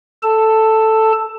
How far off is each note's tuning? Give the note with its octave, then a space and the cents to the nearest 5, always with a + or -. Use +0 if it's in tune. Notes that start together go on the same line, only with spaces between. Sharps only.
A4 +0 A5 +10